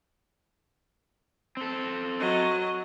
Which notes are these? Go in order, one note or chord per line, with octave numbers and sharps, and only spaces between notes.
C4 A4
F#3 D#5